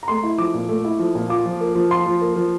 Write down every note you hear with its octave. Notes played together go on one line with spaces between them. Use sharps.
A#5
A3 C6
E4
F3 D6
A#2
A3
E4
F3
A#2
F4 D6
F3
A#3
F3
F4 C6
F3
A#3
F3